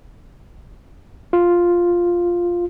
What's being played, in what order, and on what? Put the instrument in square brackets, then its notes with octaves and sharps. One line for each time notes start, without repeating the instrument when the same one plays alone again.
[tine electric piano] F4